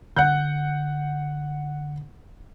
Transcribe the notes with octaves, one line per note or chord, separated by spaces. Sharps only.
D3 F#5 F#6 G6